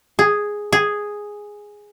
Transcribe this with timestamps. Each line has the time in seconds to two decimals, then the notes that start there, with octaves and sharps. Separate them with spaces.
0.19 G#4
0.73 G#4